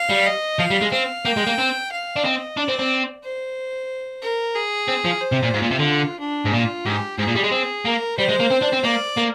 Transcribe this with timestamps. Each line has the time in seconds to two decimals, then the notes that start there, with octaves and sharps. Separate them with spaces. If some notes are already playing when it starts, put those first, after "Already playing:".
Already playing: F5
0.10 G3
0.26 D#5
0.59 F3 F5
0.70 G3
0.81 G#3
0.92 C4 F5
1.25 A#3 G5
1.37 G#3
1.47 A#3
1.58 C4
1.92 F5
2.16 D4
2.24 C4 D#5
2.57 D4 D5
2.68 C4
2.79 C4
3.23 C5
4.22 A#4
4.55 G#4
4.88 C4
5.05 F3
5.21 C5
5.32 C3
5.43 A#2
5.54 G#2 F4
5.62 A#2
5.71 C3
5.79 D3
6.20 D4
6.46 G#2
6.53 A#2 F4
6.85 G#2 G4
7.19 G#2 G#4
7.28 A#2
7.36 G3
7.44 G#3
7.52 C4
7.85 A#3 A#4
8.18 G3 C5
8.29 G#3
8.40 A#3
8.51 C4
8.62 D4
8.73 C4
8.84 A#3 D5
9.17 A#3